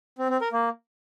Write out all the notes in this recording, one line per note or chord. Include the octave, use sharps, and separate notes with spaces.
C4
C4
A#4
A#3